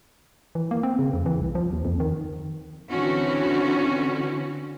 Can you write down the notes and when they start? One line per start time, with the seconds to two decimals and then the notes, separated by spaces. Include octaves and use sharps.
0.55 E3
0.71 A#3
0.83 C4
0.99 C#3
1.13 F2
1.26 E3
1.41 C2
1.55 F3
1.73 D#2
1.85 F2
2.00 D#3
2.89 D3 E3 C4 C#4 F#4